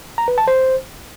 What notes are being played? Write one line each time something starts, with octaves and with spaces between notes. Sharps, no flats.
A#5
B4
A5
C5